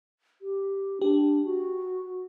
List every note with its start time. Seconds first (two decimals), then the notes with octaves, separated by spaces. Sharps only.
0.41 G4
1.01 D4 G4
1.44 F#4